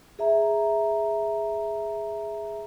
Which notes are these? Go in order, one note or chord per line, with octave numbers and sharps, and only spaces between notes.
G#4 E5 A#5